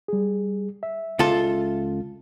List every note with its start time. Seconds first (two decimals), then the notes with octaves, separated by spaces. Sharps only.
0.08 G3 G#4
0.83 E5
1.19 C#2 F4 A4